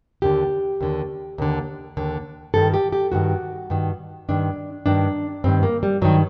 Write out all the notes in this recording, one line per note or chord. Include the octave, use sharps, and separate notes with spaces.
D#2 D3 G4
D#2 D3
D#2 D3
D#2 D3
G2 D#3 A4
G4
G4
G2 D#3 F#4
G2 D#3
G2 D#3 D4
G2 D#3 D4
G2 D#3 C4
A#3
G3
G2 D#3 F#3